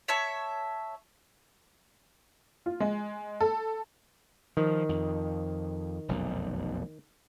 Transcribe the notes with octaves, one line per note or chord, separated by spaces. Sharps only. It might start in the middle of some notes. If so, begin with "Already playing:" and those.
C#5 E5 A5 C#6
F4
G#3
A4
D#3 F3
F2
F1 B1 F#2